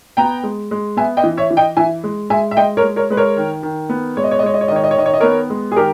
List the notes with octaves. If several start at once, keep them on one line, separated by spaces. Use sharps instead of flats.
B3 G5 A#5
G#3
G#3
B3 E5 G#5
D#5 G5
E3
C#5 E5
E3
D#5 G5
E3 E5 G#5
G#3
G#3 E5 G#5
E5
G#3 D#5 G5
A#4 C#5
G#3
A#4 C#5
G#3 B4
A#4 C#5
D#3
D#3
B3
G#3 C#5
D#5
C#5
D#5
G#3 C#5
D#5
C#5
D#3 D#5
C#5
D#5
C#5
D#3 D#5
C#5
D#5
B3 A#4 C#5
G#3
G#4
D#3 G4 A#4